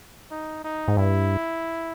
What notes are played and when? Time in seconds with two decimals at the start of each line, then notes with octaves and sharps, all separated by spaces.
0.31 D#4
0.64 D#4
0.88 G#2
0.97 G2 E4